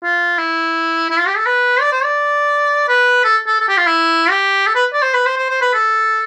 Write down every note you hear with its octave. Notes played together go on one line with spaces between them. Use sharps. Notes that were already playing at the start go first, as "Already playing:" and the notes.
F4
E4
E4
F4
G4
A4
B4
D5
C5
D5
B4
A4
A4
A4
G4
F4
E4
G4
A4
B4
D5
C5
B4
C5
C5
C5
B4
A4